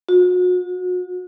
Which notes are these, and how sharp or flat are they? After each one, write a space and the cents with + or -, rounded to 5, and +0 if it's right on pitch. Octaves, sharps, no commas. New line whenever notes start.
F#4 -40